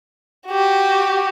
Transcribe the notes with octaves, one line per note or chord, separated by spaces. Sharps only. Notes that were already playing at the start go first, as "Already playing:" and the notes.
F#4 G4